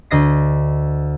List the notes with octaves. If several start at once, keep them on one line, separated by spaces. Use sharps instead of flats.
D2 D#5 A#6 C7